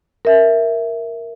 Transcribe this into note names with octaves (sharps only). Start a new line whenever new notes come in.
A#4 E5